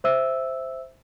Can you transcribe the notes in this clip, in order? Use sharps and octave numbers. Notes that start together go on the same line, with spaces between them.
C5 E5 E6